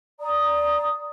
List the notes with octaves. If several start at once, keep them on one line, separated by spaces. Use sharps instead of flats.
D5 A#5 D#6